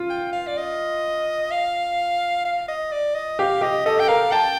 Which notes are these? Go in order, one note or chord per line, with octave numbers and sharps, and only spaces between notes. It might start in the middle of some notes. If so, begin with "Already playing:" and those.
Already playing: F4
G5
F5
D5
D#5
F5
F5
D#5
D5
D#5
G4 F5
G4 D#5
A4 D#5
G5
A#4 F5
G5 A5